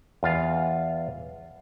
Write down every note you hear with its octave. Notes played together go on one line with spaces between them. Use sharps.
E2 F4 F5